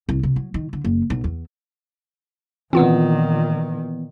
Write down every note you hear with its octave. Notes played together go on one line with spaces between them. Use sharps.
C2
C3
F#3
D#3
D3
F#1
B1
E2
A#2 D#3 E3 B3 C4 F4 F#5